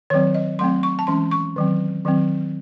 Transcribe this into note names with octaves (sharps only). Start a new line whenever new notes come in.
D#3 F#3 C4 C#5
D#5
F#3 A3 C4 C6
C#6
A5
E3 G#3 C#4 C6
C#6
D#3 F#3 C4
D#3 F#3 C4